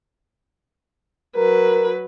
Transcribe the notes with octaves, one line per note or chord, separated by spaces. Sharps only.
F#3 A#4 B4